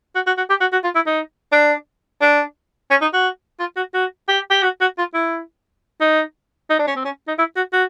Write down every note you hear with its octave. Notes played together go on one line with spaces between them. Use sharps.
F#4
F#4
F#4
G4
F#4
F#4
F4
E4
D#4
D4
D4
C#4
D#4
F#4
F4
F#4
F#4
G4
G4
F#4
F#4
F4
E4
D#4
D#4
D4
C#4
C4
C#4
D#4
E4
F#4
F#4